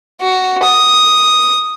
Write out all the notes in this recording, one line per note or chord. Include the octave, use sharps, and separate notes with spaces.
F#4
D#6